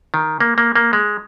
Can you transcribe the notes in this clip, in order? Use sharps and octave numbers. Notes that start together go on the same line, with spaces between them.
D#3
A#3
A#3
A#3
G#3